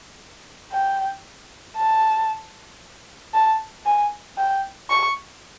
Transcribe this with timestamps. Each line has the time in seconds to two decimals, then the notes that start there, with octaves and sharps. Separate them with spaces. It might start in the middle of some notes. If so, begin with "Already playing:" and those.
0.72 G5
1.77 A5
3.34 A5
3.86 G#5
4.38 G5
4.90 C#6